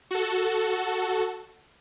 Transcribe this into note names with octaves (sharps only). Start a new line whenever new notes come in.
F#4 A4